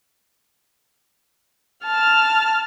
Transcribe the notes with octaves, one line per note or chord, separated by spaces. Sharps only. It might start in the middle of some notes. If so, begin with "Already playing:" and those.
A5 F6